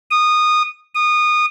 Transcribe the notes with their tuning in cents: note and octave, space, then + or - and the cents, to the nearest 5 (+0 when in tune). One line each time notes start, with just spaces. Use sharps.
D#6 -20
D#6 -25